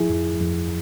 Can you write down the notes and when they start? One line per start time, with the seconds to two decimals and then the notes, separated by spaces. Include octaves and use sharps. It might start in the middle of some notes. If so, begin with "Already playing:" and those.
Already playing: F3 E4 G#4
0.10 F2
0.40 F2